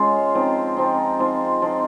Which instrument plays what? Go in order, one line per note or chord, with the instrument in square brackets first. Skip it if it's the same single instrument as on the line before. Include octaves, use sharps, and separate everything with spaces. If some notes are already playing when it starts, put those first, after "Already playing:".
Already playing: [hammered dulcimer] G#3 C#4 F4
F3 C4 D#4
F3 C4 D#4
F3 C4 D#4
F3 C4 D#4